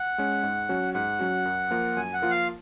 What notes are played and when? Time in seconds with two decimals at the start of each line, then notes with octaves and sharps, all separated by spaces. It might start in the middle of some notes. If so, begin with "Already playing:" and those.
Already playing: F#5
0.18 G#3 C#4
0.43 G#2
0.69 F#3 C#4 F#4
0.94 G#2 F#5
1.19 F#3 C#4 F#4
1.45 F#2
1.71 F3 A#3 F4 A#4
1.96 F#2 G#5
2.13 F#5
2.22 F3 A#3 F4 A#4
2.30 F5